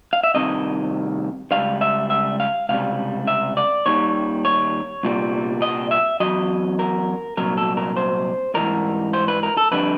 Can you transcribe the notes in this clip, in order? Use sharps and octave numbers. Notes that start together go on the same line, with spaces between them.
F5
E5
C2 C3 D#3 D#5
C#2 B2 G3 F5
E5
E5
F5
C#2 C3 G3 F5
E5
D5
D#2 D#3 G3 C#5
C#5
C2 A#2 G3
D#5
E5
E2 B2 F#3 D#5
A#4
C2 A#2 F#3 A#4
A4
A#4
C5
G#2 E3 G3 A#4
C5
B4
A#4
A4
F2 D3 G3 B4